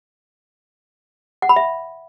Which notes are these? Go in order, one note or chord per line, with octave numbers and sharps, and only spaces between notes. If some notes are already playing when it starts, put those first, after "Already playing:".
F#5
B5
E5